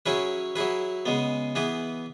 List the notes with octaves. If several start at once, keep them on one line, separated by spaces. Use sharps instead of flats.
F#3 C#4 E4 G#4 B4
F#3 E4 G#4 B4
C#3 G#3 B3
E3 B3 G#4 B4